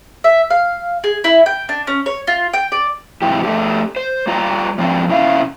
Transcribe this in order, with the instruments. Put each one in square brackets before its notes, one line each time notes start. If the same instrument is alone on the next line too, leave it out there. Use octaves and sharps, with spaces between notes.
[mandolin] E5
F5
G#4
E4
G5
D4
C#4
C#5
F4
G5
D5
[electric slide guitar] G#2 C3 E3 G4
A3 D4 G4
C5
G3 F4 D5 A#5
G#2 F3 C4 D4 F4
C3 C#4 E4 E5 F5